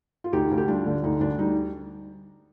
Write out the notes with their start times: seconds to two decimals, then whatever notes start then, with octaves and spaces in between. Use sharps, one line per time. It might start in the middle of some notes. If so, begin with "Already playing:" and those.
0.24 F4
0.32 D2 D#4 G4
0.51 D2
0.58 G4
0.68 G3 D4 F4
0.86 D3
1.03 D2 D#4
1.20 D2 D4
1.39 G3 D#4